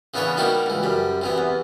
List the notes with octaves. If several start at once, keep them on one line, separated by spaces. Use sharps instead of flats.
C#3 E3 B3 D4 B4 C#5
G3 A#3 D#4 E4 F#4 G4
C#2 E3
F#2 G3
C3 E3 B3
E2